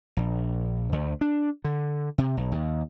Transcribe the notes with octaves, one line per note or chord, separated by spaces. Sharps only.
A#1
D2
D4
D3
C3
B1
D#2